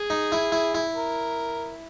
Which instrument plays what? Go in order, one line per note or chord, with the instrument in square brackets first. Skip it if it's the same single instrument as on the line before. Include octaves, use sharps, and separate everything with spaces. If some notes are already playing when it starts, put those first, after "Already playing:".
Already playing: [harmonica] G#4
[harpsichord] D#4
E4
E4
E4
[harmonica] A#4